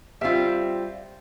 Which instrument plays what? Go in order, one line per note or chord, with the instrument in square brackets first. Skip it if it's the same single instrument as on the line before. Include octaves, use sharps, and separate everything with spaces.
[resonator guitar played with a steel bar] G3 C4 F4 [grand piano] E5